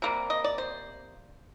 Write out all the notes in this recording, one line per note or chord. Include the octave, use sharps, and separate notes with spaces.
C3 G3 A#3
D#5
D5
C5